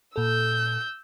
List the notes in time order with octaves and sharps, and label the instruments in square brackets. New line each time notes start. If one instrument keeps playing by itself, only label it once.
[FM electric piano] A#2 A4 [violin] E6 G6